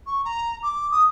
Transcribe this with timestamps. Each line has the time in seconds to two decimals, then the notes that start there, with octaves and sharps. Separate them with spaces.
0.07 C#6
0.25 A#5
0.63 D6
0.91 D#6